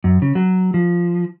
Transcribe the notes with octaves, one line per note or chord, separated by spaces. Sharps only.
F#2
C#3
F#3
F3